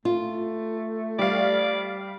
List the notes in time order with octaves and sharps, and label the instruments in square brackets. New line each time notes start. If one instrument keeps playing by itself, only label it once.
[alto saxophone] A3 [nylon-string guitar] F4
[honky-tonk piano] G3 F5 [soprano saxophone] D5